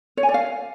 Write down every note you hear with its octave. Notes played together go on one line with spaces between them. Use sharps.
C#5
G#5
D5
F5